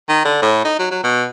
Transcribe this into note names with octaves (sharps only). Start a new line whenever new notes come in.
D#3
D3
A2
D#4
F#3
F#3
B2